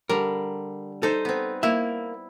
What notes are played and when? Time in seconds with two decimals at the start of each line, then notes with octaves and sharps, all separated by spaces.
0.09 D3 G3 A#4
1.03 D#4 A4 C5
1.25 B3 C4
1.63 A#3 E4 E5